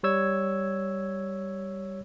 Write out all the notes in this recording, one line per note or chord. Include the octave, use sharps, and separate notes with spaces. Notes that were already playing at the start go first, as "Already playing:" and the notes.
G3 C#5 E6 G#6